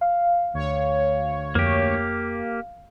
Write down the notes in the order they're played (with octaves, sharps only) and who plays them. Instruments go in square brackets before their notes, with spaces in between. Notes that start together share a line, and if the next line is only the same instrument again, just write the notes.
[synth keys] F5
[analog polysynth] D2 C#5
[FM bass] F2 [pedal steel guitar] A#3 G4